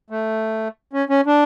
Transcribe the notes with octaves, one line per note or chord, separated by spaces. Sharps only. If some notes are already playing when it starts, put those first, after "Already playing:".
A3
C#4
C#4
D4